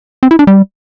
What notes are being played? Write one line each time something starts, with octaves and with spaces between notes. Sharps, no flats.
C4
E4
D4
G3